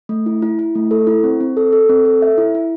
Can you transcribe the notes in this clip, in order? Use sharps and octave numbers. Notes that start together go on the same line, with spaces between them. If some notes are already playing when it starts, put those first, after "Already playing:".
A3
E4
E4
E4
A3
A4
E4
C4
C4
A4
A4
C4
A4
E5
E4
E4